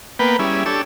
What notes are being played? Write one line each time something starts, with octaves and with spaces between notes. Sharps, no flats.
A#3 B3 B4 G5
G3 C#4 E4 G#4
D4 G4 A4 C#5 E6